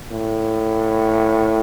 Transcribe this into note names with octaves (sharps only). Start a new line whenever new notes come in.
A2